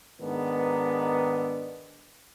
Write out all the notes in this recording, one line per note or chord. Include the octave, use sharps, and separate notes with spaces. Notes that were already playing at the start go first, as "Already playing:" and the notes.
G#2 D#3 B3 D4